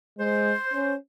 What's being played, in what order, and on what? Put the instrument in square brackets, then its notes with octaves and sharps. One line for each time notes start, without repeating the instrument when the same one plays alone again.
[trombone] G#3 [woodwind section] C5
[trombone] C#4